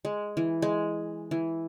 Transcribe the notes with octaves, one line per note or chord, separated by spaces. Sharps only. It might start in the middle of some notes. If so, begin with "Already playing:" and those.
G#3
E3
G#3
E3